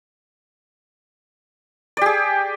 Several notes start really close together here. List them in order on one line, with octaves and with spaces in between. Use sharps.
D5 G4 G#4